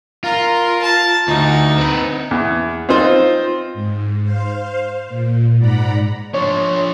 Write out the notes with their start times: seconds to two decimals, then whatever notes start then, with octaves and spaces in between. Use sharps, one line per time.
0.24 F4 A#4
0.82 A5
1.28 D2 D#4
1.78 C4 B4
2.31 E2
2.89 C4 D#4 F4 C5
3.74 G#2
4.24 C5 F5
5.08 A#2
5.58 G#2 D5 F#5 A#5 B5
6.34 F3 D4 C#5